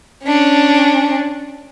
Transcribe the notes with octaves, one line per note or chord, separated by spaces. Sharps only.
C#4 D4